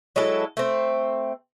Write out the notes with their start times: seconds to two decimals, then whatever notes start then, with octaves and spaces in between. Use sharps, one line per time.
0.16 F#3 G#3 E4 A4
0.57 A3 C4